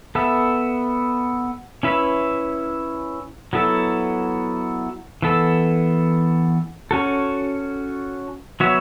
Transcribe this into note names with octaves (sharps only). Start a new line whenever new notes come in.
B3 A4 E5
C#4 E4 B4 E5
F#3 B3 E4 A4
E3 B3 A4
C#4 F#4 A4
F#3 B3 F#4 C#5 E5